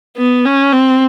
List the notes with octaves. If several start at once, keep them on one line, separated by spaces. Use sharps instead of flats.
B3
C#4
C4